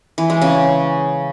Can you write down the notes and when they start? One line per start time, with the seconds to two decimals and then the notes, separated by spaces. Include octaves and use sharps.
0.18 E3
0.30 G#3
0.42 C#3